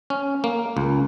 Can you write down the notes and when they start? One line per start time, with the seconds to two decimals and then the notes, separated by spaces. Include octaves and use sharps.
0.10 C#4
0.44 A#3
0.77 C#2